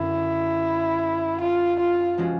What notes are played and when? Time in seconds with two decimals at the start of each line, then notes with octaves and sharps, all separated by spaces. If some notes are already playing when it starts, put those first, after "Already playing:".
Already playing: F#2 D3 E4
1.41 F4
1.80 F4
2.18 F3 G#3 C#4 F#4